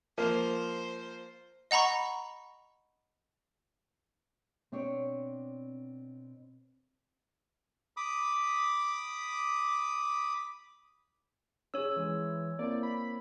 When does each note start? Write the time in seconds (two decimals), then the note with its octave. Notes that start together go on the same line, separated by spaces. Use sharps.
0.18 F3 A#3 C5
1.71 D#5 F#5 A#5 B5 C#6
4.72 B2 C4 D4 C#5 D5
7.97 B5 D6 D#6
11.74 C#4 G#4 C#5 E6
11.96 E3 G#3
12.59 A#3 C4 E4 D5
12.83 B5